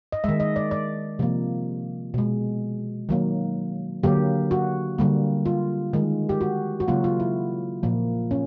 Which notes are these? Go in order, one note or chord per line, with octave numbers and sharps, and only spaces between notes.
D#5
D#3 G#3 E5
D#5
D5
D5
C3 F3 A#3
B2 G#3
D#3 F#3 A#3
D3 F#3 A#3 G4
F#4
D3 G3 A#3
F4
D#3 G#3
G4
F#4
F#4
C#3 F#3 A#3 F4
F4
E4
A#2 F3 A#3
C#4